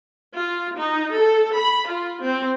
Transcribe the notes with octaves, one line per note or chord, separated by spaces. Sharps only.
F4
D#4
A4
B5
F4
C4